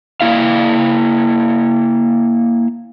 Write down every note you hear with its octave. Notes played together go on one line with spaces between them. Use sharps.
A#3 E4 F5